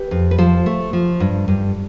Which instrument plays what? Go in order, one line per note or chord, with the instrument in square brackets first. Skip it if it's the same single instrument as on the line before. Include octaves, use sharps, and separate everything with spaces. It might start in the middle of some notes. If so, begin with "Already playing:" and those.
Already playing: [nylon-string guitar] G4 B4
F2
B4
F3 A4 C5
A3
F3
G2
G2